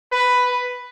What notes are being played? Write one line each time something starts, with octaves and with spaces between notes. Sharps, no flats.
B4